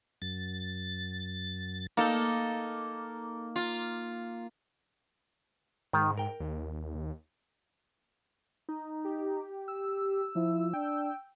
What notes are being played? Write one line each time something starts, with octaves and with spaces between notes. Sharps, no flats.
F#2 A6
A#3 D#4 A4
F4
G#2 D#3
A#4 G5
D#2
D#4
G4
E6
F3 E4
D4 G5